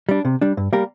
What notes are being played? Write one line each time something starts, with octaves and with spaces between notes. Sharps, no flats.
G3 D4
C3
G3 D4
G2
G3 A#3 G4 A#4